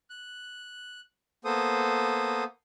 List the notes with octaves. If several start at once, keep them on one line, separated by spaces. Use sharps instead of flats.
F#6
A#3 B3 A4 C5 D#6